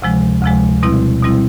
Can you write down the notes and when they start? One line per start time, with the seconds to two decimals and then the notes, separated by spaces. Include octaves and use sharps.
0.02 D2 C3 F3 G#3
0.42 D2 C3 F3 G#3
0.83 B2 G3 C4 E4
1.22 B2 G3 C4 E4